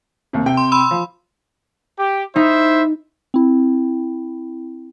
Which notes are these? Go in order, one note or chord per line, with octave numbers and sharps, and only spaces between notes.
D#2 C3
C3 G5
C6
B5 C6 E6
F3
G4
D#4 E4 C5 E5
C4 E4